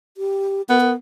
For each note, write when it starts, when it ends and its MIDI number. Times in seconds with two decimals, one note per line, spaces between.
0.17 0.62 67
0.69 0.93 59
0.69 0.78 70
0.81 0.94 70